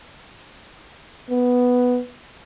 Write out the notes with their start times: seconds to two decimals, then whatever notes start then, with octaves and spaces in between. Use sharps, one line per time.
1.30 B3